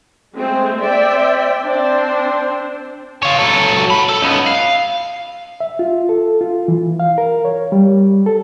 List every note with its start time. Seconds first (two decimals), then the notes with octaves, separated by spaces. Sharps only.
0.33 G#3 A3 C4 G#4
0.81 C4 D5 E5 G5
1.63 C4 D4 C5
3.23 F4 C#5
3.39 F#3 A4
3.90 F#3 B5
4.09 A4
4.21 C#2 B3
4.47 F5
5.60 E5
5.79 F4
6.09 A4
6.41 F4
6.68 E3
7.00 F5
7.18 A#4
7.45 C#5
7.72 G3
8.26 A4